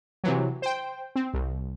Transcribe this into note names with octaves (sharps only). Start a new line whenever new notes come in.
C3 E3 F#3
C5 G5
C4
C2